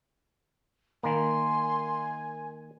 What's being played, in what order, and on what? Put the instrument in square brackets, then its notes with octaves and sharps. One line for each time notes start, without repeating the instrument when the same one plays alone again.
[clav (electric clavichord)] D#3 A#3 [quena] G#5 [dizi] C6